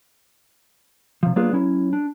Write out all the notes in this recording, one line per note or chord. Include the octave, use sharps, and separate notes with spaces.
C3 F3
F#3 A#3 B3 D4 F4 G#4
F#3 C#4 E4
D4